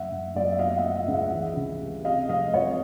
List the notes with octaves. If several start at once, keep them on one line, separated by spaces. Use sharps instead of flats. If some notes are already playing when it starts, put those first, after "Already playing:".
Already playing: F#1 E5 F#5
F#1
F#1 D5
D#5
E5
B2 D#5 F5
F5
E5 F#5
B3
E5 F#5
C#2
E5 F#5
E3
C#3
G3
C3 D#5 F5
F1 D#5 F5
F1 C#5 D#5